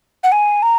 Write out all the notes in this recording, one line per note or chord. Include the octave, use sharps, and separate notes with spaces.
F#5
G#5
A#5